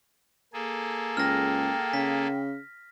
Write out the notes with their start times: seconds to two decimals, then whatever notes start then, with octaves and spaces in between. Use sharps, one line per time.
0.54 A#3 G#4 A4
1.17 C#2 G5 F6 A#6
1.93 C#3 B6